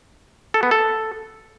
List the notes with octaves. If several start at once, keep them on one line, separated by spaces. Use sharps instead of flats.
A4
B3
A4